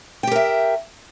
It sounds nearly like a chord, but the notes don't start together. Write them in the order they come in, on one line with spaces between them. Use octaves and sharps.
G5 G4 A#4 E5